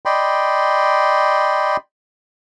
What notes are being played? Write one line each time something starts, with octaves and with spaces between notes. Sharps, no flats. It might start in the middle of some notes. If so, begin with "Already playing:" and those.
D5 D#5 G5 B5 C6